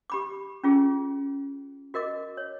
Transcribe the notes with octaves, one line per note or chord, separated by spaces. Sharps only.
G4 B5 D6
C#4 F4 G#4
F#4 A#4 D#5 D6
C#5